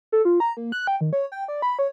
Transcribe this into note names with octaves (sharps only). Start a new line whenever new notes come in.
A4
F4
A#5
A#3
F#6
G5
D#3
C#5
G5
D5
B5
C#5